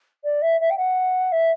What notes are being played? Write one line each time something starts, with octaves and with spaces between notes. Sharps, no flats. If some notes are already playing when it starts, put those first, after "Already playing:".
D5
E5
E5
G5
F#5
E5